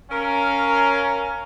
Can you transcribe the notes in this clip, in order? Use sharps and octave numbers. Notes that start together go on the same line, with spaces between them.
C#4 A#4 F5